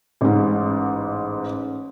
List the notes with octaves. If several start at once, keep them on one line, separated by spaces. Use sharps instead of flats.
A1 G#2